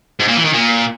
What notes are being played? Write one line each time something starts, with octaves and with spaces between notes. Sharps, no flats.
G#2
A#2
E3
D#3
A#2